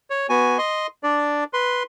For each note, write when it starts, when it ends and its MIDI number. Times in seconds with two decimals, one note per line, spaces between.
0.10 0.27 73
0.29 0.58 59
0.29 0.58 66
0.29 0.58 80
0.58 0.87 75
0.58 0.87 84
1.03 1.44 62
1.03 1.44 74
1.53 1.83 71
1.53 1.83 84